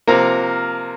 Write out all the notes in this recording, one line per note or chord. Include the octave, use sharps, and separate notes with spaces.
C3 F3 A#3 A#4 A#5